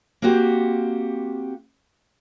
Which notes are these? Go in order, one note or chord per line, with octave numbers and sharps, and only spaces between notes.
A#3 C4 F#4 G4